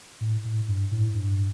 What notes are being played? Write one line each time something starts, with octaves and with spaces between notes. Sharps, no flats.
A2
A2
G2
A2
G2